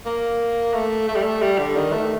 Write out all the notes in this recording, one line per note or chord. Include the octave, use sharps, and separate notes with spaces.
A#3
A3
A3
G3
A3
G3
D3
D#3
A3